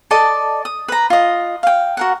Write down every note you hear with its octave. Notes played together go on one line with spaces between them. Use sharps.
A4 D5 D#5 A5
D#6
B4 A#5
F4 D#5
F5 G5
F#4 A#4 F#5